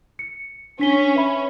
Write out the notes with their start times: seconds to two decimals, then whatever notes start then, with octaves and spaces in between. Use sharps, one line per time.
0.19 C#7
0.79 C#4 D4 B6 G7
1.15 B4 E5 B5